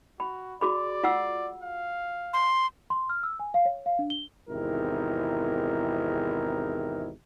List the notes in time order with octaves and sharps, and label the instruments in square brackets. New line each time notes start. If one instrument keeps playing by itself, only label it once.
[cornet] F#4 [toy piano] B5
[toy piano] F#4 G#4 B5 [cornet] D5
[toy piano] F4 F#5 E6
[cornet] F5
[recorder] C6
[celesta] C6
F6
E6
G#5
F5
C#5
F5
D4
G7
[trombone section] G#1 E2 C3 D#4 E4 A#4